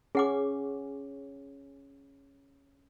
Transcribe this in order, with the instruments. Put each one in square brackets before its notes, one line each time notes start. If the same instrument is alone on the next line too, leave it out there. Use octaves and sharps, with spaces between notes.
[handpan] C#4 [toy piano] G#4 F#5 D6